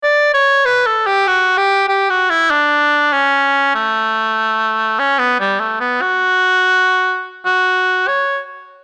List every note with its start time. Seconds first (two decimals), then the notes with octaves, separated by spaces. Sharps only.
0.03 D5
0.34 C#5
0.65 B4
0.86 A4
1.07 G4
1.28 F#4
1.58 G4
1.89 G4
2.10 F#4
2.30 E4
2.51 D4
3.13 C#4
3.75 A3
4.99 C#4
5.19 B3
5.40 G3
5.60 A3
5.81 B3
6.02 F#4
7.46 F#4
8.08 C#5